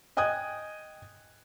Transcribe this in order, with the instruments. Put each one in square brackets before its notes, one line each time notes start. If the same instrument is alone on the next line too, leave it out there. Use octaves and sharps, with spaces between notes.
[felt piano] D#5 G5 G#5 D#6 F#6 G#6